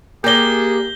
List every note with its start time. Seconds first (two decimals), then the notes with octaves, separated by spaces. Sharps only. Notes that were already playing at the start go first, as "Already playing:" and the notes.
0.24 A#3 G4 G#4 D5 G6 A#6 G7